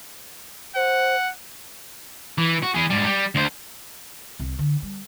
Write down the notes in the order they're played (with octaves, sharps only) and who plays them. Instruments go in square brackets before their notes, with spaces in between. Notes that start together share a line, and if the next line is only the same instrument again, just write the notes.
[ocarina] C5 [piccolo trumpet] F#5
[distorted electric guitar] E3
F#4
E3 G#4
G#2 G3
G3
D2 C5
[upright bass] C2
D3
G3